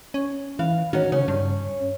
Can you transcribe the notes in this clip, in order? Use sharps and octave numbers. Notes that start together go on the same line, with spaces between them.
C#4
E3 F5
D#3 C#4 F#4
C#3 C#4
G2